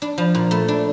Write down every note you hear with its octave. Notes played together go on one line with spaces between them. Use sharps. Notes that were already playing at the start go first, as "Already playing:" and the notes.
D4
F3
A#2
A3
D4